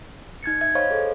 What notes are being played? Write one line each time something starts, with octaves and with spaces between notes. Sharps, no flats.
D#4 G#6 A6 C#7
E5 G#6
C5 C#5 D#5 F5 B5 C#6
G#4 A4 C5